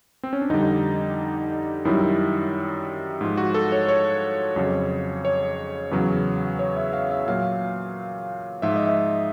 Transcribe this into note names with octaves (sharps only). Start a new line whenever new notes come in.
C4
C#4
D4
F2 D3 G3 D#4
F#2 D#3 G3 E4
G#2 F3
F#4
A4
C#5
C#5
F2 C#3 F#3
C#5
E2 C#3 F#3
C#5
E5
F5
E5
A#2 F#3 F5
G#2 F3 E5
D#5
E5